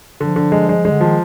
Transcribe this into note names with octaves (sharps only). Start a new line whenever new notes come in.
D3 F3
D3
G#3
G#3
G#3
D3
D#3 F3